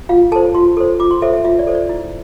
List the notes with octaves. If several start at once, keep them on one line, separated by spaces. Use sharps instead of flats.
F4 F5
A4 C5 A5
F4 C6
A4 C5
F4 D6
C6
A4 C5 E5
E5
F4 E5
D5
A4 C5
D5
E4